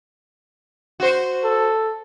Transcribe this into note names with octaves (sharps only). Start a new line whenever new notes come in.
F#4 C5
A4